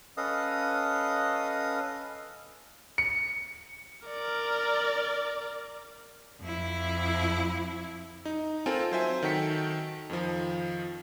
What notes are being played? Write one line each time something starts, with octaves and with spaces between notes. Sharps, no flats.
C#4 A4 B4 D#5 F5 D#6
C#7
A#4 D5
F2 E4
D#4
C4 F4 A4 A#4 G5 G#5
F#3 C5 E5 G#5
D#3 F#4 A4 G5 B6 C#7
F2 D#3 F3